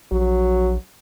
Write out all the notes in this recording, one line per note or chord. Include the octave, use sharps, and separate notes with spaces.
A#1 F#3